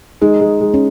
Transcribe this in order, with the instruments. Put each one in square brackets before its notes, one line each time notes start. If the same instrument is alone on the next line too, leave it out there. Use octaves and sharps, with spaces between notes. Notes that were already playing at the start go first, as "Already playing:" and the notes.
[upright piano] G#3 [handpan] D#4
[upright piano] G#3
G#3
[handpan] C#4